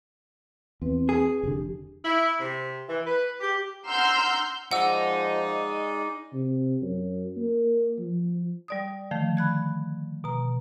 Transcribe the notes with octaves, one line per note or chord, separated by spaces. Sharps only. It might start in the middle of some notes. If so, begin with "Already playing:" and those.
E2 C4 B4
G#4
F1 D3 G4
E4
C3
E3
B4
G4
F#5 A#5 C6 E6 F6 G6
F3 G#3 D#4 D5 F#5 E6
C3
F#2
A#3
F3
G3 D5 D#6
D3 D#3 F3 A3
B5 F#6 G#6
B2 A#5